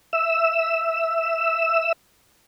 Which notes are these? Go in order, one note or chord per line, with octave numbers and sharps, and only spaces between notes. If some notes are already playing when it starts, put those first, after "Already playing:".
E5 E6